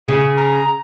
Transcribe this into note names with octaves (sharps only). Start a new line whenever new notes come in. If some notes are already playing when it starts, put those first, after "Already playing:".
C#3 G#4
A#5